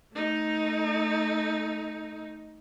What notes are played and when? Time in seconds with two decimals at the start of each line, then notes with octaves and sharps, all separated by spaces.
0.14 A3 D#4